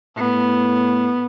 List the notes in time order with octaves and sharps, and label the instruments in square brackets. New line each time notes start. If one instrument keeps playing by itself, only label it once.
[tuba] A2 [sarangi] B3